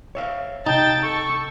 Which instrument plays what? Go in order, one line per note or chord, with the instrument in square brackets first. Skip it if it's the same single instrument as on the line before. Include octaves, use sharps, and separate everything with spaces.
[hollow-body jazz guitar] C#5 E5 F5
[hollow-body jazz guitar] B1 C3 [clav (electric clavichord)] D#4 [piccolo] G5 [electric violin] A5 A6
[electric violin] A4 [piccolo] C#6